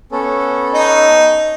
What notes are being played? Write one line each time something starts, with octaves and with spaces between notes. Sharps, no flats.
B3 C#4 A4
D#4